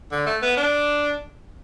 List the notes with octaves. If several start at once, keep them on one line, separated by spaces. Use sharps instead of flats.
D3
A3
B3
D4